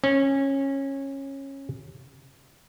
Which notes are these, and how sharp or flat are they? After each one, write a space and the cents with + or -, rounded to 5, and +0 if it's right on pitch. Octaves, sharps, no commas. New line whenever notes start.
C#4 -20